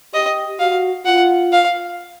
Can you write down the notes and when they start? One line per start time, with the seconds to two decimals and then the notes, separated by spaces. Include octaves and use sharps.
0.14 G4 D#5
0.59 F#4 F5
1.05 F4 F#5
1.52 F5